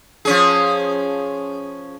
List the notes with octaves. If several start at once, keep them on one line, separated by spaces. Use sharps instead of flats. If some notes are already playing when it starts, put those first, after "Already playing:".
F3 C#4 G#4